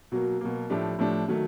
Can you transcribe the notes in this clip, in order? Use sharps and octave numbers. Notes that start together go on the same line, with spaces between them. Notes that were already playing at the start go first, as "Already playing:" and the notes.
B2 F#3 A#3
B2 F#3 A#3
A2 F3 A3 D4 G4
A2 F3 A3 D4 G4
D#3 F#3 A3